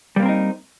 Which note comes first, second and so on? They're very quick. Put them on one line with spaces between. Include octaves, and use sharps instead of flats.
G3 A#3 C4 A#4 D#4